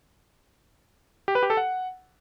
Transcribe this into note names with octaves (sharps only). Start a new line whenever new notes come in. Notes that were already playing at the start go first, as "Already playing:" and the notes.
G4
B4
G4
A4
F#5